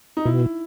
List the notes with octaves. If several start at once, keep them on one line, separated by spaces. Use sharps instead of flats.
D#4
B2 E4